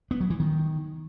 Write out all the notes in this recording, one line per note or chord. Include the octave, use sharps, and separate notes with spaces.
B3
F#3
E3
D#3